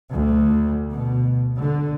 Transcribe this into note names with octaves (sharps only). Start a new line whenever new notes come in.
D2
B2
D3